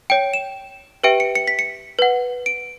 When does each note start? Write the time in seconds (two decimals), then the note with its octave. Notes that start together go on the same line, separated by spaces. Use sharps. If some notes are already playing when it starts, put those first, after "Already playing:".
0.10 C#5 G5 D7
0.34 E7
1.04 G4 B4 E5 G5 D7
1.20 C#7
1.35 C#7
1.48 B6
1.59 C#7
1.99 B4 F#5
2.46 D7